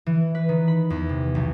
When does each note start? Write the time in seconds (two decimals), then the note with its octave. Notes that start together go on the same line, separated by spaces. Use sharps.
0.06 E3
0.35 B4
0.49 D#3
0.68 B5
0.90 E2
1.09 C3
1.35 B1